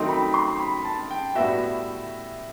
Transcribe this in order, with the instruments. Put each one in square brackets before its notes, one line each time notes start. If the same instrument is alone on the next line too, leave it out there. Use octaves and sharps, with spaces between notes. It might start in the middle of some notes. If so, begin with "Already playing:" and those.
Already playing: [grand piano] D#3 F#3 A3 C4 D#4 [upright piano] C6
[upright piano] B5
C6
B5
A5
G5
[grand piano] A2 G3 B3 F#4 [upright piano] E5